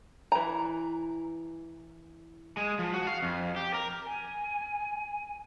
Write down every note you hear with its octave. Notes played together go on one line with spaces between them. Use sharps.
E3 A#5
G#3
F3
F#4
F5
F2
G4
A#4
G#5